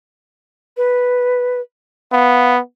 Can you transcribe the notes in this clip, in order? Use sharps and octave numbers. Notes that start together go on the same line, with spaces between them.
B4
B3 F5